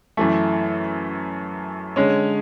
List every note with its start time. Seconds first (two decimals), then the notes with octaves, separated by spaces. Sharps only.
0.17 F#2 E3 A3
1.96 D3 G#3 C#4